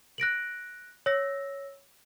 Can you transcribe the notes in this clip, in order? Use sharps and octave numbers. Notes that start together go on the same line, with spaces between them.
F#6 A#6 D7 F#7
C#5 E6 A#6